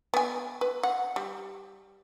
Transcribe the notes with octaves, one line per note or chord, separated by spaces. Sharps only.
B3 G#5
B4
F#5
G3